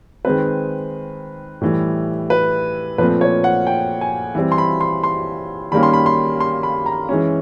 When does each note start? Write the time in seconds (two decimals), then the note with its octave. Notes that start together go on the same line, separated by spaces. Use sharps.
0.25 D#3 G#3 C4 B4
1.61 A2 E3 G3
2.30 B4
2.98 A#2 F3 A3 C4 B4
3.21 C#5
3.44 F#5
3.67 G5
4.01 G#5
4.35 E3 G3 C4
4.52 C6
4.58 B5
4.81 C6
5.03 C6
5.72 D#3 G3 A#3 C#4 B5
5.83 C6
5.93 B5
6.06 C6
6.40 C6
6.63 B5
6.86 A#5
7.09 E3 G#3 C#4